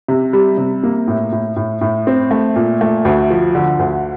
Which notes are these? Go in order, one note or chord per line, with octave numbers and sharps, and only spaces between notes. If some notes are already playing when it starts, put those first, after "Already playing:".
C3
G3
C3
A#3
A2
A2
A2
A2
C4
A3
A#2
A3
D2
F3
D3
D2